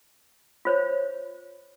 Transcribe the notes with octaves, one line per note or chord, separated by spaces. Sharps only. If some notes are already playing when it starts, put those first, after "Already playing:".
F4 C5 C#5